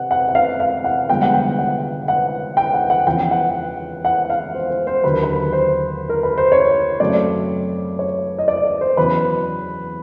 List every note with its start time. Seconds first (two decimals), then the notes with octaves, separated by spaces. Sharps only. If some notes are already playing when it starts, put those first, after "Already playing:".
Already playing: C3 F#5
0.11 F#5
0.28 F#5
0.35 F5
0.60 F5
0.84 F#5
1.09 G2 D3 F3 G#3 B3 G5
1.22 F#5
1.34 G5
1.59 F#5
2.08 F#5
2.57 G5
2.73 F#5
2.90 F#5
3.06 E2 C#3 F3 G5
3.31 F#5
4.05 F#5
4.30 F5
4.55 C5
4.70 C5
4.87 C5
5.03 D#2 D3 F#3 B4
5.13 A#4
5.23 B4
5.52 C5
6.09 A#4
6.23 B4
6.38 C5
6.52 C#5
7.00 F#2 C#3 F#3 A3 C4 D5
7.99 C#5
8.38 D#5
8.48 D5
8.65 D5
8.81 C5
8.97 E2 C#3 F#3 B4